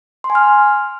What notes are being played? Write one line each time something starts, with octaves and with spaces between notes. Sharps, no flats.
C6
G#5
F6